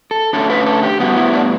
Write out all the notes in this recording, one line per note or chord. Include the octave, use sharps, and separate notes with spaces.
A4
D3 A3 C#4 A4
B4
A4
G4
A2 G3 B3 F#4
E4
D4